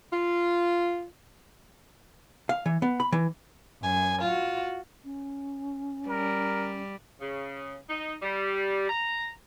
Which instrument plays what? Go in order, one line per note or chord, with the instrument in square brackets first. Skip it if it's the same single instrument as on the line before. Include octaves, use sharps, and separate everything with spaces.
[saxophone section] F4
[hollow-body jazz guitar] F5
E3
B3
B5
E3
[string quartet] F#2 G#5
F4 F#4
[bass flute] C#4
[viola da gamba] G3 [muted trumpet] A#4
[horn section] C#3
D#4
G3
A#5